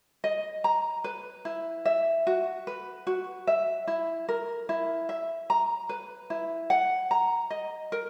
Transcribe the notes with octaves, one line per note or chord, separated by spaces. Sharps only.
D#5
A#5
B4
E4
E5
F#4
B4
F#4
E5
E4
A#4
E4
E5
A#5
B4
E4
F#5
A#5
D#5
A#4